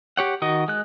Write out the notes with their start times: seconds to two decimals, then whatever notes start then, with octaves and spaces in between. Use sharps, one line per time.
0.17 G4 C#5 F#5
0.42 D#3 F#4 D#5
0.68 G#3 F#6